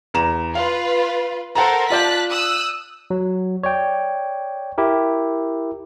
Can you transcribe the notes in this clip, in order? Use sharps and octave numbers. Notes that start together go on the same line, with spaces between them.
E2 A#5 E7
F4 B4 F5
A4 A#4 C5 F#5 A5 A#5
F4 D5 A5 F#6 G6 B6
D#6 E6 F#6
F#3
C#5 D5 G5
E4 G4 A#4